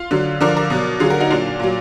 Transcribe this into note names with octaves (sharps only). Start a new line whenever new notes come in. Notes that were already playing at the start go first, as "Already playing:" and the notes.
Already playing: F4
D3 F#3
D3 F3 A#4 D5
A#4 D5
B2 F#3
D3 F#3 F4 G#4
F#4 A#4
D#4 F#4
A#2 F#3 D4 F4
A#2 F#3